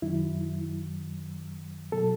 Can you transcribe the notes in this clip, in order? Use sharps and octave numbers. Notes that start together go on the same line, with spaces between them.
F#2 D#3 F#3 E4
B2 F#3 A4